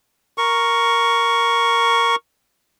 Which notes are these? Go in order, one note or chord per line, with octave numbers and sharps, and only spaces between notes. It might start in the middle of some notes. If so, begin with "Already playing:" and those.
A#4 C#6